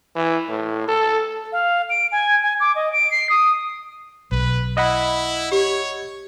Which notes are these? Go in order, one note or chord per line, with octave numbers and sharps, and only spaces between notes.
E3
A2
A4
F5
D7
G#5
G#5
D6
D#5
D7
C7
D#6
B1 B4
E4 D#5 F#5 B5
G4 C#5